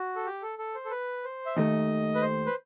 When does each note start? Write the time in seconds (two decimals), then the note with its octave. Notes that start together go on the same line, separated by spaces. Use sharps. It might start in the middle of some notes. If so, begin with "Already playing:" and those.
Already playing: F#4
0.16 A4
0.26 G4
0.43 A4
0.59 A4
0.75 C5
0.85 A4
0.91 B4
1.24 C5
1.46 E5
1.56 D#2 D#3 A3 D#5
2.15 B4
2.22 C5
2.46 B4